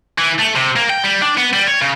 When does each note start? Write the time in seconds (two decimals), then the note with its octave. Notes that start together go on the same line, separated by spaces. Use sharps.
0.18 E3
0.39 A3
0.55 C3
0.76 A#3
0.89 G5
1.04 G3
1.22 D4
1.38 B3
1.54 G3
1.67 C#5
1.82 C#3